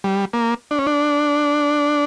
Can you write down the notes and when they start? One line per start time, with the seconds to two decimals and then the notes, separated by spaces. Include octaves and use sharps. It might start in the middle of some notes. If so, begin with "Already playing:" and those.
0.04 G3
0.33 A#3
0.71 D4
0.79 C#4
0.87 D4